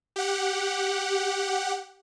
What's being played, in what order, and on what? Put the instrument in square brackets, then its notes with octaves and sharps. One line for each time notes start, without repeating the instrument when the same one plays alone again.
[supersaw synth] G4 F#5